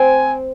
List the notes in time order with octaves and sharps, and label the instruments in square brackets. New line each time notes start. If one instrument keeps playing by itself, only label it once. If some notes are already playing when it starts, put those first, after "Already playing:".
Already playing: [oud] C4 [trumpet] G#5